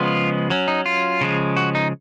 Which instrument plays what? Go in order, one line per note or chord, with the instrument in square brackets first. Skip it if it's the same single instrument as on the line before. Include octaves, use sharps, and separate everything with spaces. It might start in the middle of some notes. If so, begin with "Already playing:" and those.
Already playing: [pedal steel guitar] C#3 F3 G#3 B3 F4
F#3 C#4
D#4
F4
C#3 F3 G#3
F#4
D#4